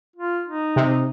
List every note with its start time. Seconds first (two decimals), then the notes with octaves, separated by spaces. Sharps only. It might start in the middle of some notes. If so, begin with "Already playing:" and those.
0.16 F4
0.49 D#4
0.76 C3